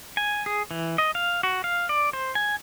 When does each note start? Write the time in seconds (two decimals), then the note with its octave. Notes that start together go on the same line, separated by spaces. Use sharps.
0.17 G#5
0.46 G#4
0.71 E3
0.98 D#5
1.15 F5
1.43 F#4
1.64 F5
1.89 D5
2.13 C5
2.35 G#5